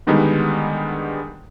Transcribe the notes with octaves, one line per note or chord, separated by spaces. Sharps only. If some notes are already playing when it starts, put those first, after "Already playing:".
D3 D#3 G3 G#3 B3 D#4